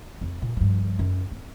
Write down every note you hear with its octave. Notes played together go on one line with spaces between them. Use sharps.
F2
A#2
G2 F3
F#2
C4